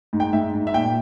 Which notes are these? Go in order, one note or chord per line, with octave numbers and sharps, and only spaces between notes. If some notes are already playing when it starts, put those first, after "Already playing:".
G#2
G5
G#2 E5
G#2
E5
A#2 G5